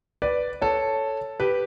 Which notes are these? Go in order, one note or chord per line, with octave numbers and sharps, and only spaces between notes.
B4 D5
A4 C#5
G4 B4